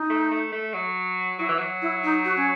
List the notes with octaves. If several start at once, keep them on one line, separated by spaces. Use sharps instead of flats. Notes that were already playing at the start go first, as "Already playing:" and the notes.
Already playing: D#4
A3
A3
A3
F#3
F#3 E4
E3
F#3
E4
D#4
F#4
C#4